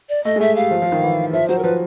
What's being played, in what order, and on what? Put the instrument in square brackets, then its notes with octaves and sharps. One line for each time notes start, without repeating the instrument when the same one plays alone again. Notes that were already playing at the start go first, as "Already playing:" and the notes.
[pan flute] D5
[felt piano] A3 [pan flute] D#5
[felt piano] G#3
[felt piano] A3 [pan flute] E5
[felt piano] G3 [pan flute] F5
[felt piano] F3
F3
D#3
E3
[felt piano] F3 [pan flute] E5
[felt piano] F#3 [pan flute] C5
[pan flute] A#4
[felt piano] F3 [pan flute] B4